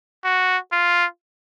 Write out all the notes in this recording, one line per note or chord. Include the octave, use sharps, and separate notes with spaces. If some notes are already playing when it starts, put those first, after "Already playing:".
F#4
F4